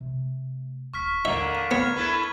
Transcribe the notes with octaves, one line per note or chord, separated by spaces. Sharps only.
C3 A3
D#1 A#3 C#6 F6 B6
D#2 A2 D3 A#3 E5
A1 B3 F6 G#6
E2 E4 A4 B4